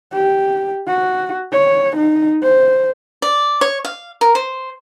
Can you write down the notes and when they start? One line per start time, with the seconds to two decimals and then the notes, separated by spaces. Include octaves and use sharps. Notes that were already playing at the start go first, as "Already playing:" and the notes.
0.13 G4
0.88 F#4
1.53 C#5
1.97 D#4
2.43 C5
3.22 D5
3.61 C#5
3.85 F5
4.21 A#4
4.35 C5